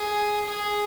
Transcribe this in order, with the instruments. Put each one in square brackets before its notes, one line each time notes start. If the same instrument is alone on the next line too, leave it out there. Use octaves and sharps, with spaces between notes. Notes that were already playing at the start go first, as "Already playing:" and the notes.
Already playing: [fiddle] G#4
G#4